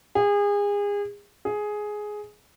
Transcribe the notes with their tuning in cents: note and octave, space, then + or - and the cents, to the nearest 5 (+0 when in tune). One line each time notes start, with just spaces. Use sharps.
G#4 -30
G#4 +10